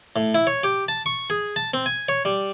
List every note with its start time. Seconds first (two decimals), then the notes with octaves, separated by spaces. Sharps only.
0.16 A2
0.34 E4
0.47 C#5
0.63 G4
0.88 A5
1.06 C#6
1.30 G#4
1.56 A5
1.74 C4
1.86 G#5
2.09 C#5
2.25 G3